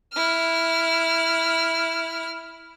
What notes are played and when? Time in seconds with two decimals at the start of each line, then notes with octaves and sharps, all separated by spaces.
0.13 E4 F6